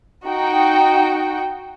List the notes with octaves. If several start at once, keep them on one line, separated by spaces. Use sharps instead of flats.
D#4 F#4 G5